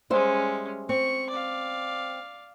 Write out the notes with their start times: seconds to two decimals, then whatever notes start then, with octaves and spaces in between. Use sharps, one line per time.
0.10 G3 G#3 C#4 C5 E5
0.89 C4 C#6
1.30 D5 F5